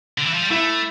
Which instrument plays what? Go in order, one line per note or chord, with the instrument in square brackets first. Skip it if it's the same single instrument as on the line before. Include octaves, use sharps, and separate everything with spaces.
[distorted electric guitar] D3
E3
F3
G3
[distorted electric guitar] A3 [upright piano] E4